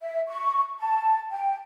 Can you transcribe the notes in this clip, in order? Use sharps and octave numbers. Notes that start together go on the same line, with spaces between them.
E5
C#6
A5
G5